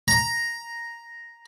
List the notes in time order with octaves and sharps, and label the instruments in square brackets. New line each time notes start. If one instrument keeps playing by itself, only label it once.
[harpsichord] A#5